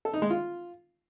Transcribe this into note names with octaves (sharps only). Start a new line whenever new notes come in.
A4
D#4
G#3
F4